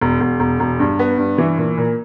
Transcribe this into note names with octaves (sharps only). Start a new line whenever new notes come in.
E1
E1
E1
E1
G2
B3
G2
E3
A#2
A#2